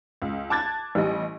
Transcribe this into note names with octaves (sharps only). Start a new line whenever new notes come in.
C#2
A5 D6 F#6 G#6 A6
A1 G3 D#5